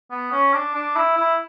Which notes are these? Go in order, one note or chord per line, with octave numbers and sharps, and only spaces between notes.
B3
C#4
D4
D4
E4
E4